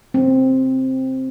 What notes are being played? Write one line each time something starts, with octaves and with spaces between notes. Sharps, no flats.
C4